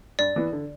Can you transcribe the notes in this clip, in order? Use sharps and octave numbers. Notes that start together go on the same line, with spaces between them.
G2 D5
E3 B3
D3